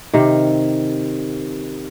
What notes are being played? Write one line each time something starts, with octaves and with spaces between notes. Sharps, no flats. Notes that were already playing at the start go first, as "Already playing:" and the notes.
C3 D#3